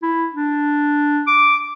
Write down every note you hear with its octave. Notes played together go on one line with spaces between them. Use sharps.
E4
D4
D6